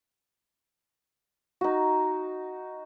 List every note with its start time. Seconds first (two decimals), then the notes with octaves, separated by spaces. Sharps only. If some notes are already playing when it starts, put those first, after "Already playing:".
1.61 D#4 F#4